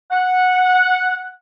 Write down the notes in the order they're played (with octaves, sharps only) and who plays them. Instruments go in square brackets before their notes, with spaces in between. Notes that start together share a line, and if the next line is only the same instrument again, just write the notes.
[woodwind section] F#5